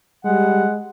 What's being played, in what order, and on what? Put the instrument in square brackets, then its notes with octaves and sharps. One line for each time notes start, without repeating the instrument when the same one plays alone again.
[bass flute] G3 [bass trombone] G#3 [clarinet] F#5